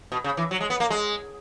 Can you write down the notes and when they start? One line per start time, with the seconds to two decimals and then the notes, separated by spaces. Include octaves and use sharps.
0.12 B2
0.24 C#3
0.37 E3
0.51 F#3
0.60 G#3
0.70 B3
0.80 A#3
0.90 G#3